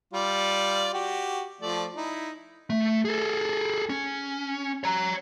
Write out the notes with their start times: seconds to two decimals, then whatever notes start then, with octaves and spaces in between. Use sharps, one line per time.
0.13 G3 F4 D5
0.93 F#4 G4
1.61 F3 A3 D5
1.96 D#4 E4
2.70 A3
3.05 G#4 A4
3.89 C#4
4.84 C#5 A#5